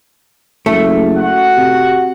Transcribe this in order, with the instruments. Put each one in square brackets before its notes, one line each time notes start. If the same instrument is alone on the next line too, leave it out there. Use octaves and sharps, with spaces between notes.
[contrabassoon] F#1 [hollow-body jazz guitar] A3
[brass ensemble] F#4 F#5
[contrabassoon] C3